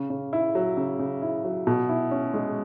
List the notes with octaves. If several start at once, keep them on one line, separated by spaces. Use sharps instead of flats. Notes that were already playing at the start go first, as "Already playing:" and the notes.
Already playing: C#3
C#3
E4
F#3
C#3
C#3
E4
F#3
B2
E4
C#4
G#3